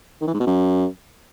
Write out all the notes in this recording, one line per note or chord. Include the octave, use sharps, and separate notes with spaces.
D#3
E3
G#2
B2
F#2